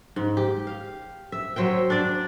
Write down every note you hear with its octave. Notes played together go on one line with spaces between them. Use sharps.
G#2
G4
F5
E5
F#3 C5 E5 G5
D4 D5